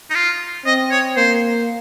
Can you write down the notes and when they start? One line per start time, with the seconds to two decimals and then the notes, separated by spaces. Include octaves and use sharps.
0.10 D#4
0.15 F4
0.65 C4 D#5
0.91 C#5
1.17 A#3 C5